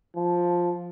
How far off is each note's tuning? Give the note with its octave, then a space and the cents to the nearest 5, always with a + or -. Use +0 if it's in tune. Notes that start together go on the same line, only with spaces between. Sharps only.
F3 +5